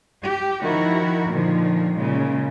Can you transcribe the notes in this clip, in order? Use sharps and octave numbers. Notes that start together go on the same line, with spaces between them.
G4
D#3 F3 E4 F#4 A#4
A#2 D3 D#3 F3
A#2 C#3 G#3